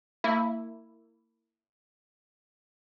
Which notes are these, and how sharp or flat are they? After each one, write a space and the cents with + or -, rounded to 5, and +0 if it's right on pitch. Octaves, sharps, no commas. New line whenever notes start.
A#3 -30 E4 +0